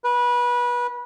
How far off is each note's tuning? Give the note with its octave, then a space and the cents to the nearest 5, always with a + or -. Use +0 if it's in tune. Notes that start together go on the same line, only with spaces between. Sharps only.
B4 -25